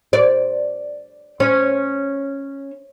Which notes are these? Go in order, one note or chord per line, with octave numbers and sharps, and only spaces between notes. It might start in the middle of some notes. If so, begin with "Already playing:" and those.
D5
C#4